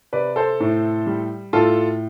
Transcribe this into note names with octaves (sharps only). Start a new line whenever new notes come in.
C3 B4 D5
A4 C5
A2
G3
A2 F4 A4